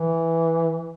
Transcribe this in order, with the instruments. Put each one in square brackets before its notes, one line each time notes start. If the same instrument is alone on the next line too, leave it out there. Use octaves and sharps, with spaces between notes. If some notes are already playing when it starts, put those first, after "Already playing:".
Already playing: [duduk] E3